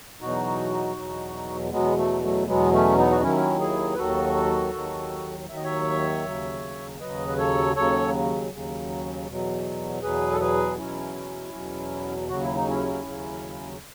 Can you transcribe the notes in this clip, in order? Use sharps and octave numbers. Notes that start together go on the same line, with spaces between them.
E2 B2 F#3 D#4 F#4
E2 B2 F#3
E2 B2 F#3 G#3 B3
F#3 A3
F#3 A3
E2 B2 F#3 G#3 B3
A3 C#4
B3 D#4
F#4
D#2 D#3 F#3 C#4 E4
E4 G#4
B4
D#2 D#3 F#3 F#4 A4
D#2 D#3 F#3
D#2 D#3 F#3 E5
D#5
C#5 E5
D#2 C#3 F#3
D#2 C#3 F#3 B4 D#5
B4
A4 C#5
D#2 C#3 F#3 A4 C#5
D#2 C#3 F#3
E2 B2 F#3
E2 B2 F#3 G#4 B4
A4
G#4 B4
E2 B2 F#3 C#4 E4
E2 B2 F#3
D#2 C#3 F#3 F#4
E4
D#4
C#4 E4
D#2 C#3 F#3